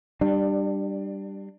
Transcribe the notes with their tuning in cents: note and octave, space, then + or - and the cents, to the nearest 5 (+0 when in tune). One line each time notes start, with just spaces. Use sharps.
G3 +0 D4 +25